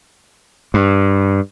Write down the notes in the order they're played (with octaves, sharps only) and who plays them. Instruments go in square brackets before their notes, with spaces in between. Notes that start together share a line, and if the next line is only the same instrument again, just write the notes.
[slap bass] G2